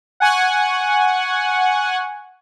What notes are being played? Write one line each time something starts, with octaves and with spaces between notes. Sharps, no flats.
F#5 G#5 C#6